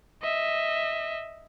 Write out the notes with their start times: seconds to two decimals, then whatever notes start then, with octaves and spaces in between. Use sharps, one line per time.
0.22 D#5 E5